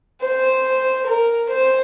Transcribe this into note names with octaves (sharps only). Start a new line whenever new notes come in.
C5
A#4
C5